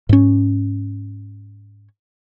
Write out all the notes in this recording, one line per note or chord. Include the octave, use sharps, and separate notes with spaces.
G#2 C#4